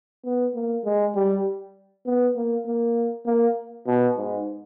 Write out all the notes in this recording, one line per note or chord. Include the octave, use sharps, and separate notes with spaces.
B3
A#3
G#3
G3
B3
A#3
A#3
A#3
B2
G#2